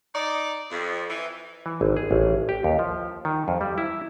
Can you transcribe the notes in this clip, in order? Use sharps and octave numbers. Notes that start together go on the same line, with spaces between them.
D#4 D5
F2
E3
E3
G#1
G#4
A1
G4
D#2
F3
D#3
F2
G3
E4